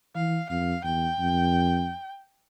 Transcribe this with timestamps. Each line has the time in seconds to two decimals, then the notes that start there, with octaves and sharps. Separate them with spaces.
0.15 E3 F5
0.50 F2 F5
0.84 E2 G5
1.19 F2